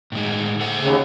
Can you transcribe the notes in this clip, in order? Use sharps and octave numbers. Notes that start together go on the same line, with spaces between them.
A2 D#3 G#3
A4 C5 F#5
D#2 C#3